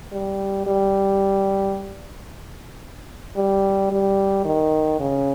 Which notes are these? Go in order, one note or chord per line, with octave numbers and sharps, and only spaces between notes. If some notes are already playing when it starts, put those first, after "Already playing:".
G3
G3
G3
G3
D#3
C#3